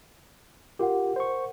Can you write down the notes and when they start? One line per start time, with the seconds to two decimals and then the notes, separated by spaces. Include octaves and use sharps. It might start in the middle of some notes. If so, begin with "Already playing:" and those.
0.79 F4 G4 A#4 F#5
1.16 C5 C#6